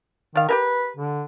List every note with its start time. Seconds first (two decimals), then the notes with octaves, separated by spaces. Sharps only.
0.36 D#3 D5 F5
0.49 G4 G#4 A#4 B4
0.97 D3